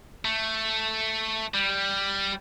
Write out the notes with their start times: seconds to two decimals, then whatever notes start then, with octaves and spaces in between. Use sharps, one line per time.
0.25 A3
1.54 G3